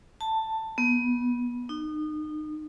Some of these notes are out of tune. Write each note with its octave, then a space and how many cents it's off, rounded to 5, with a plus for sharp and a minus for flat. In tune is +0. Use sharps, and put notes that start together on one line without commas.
A5 +10
B3 -20
D#4 -30